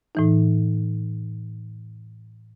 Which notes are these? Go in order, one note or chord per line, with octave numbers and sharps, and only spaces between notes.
A2 E3 D#4